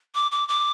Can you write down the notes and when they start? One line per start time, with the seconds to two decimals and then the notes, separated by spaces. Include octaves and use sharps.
0.15 D6
0.32 D6
0.48 D6